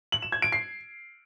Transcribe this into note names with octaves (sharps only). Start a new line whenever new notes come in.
F#7
E7
G#6
D7
C7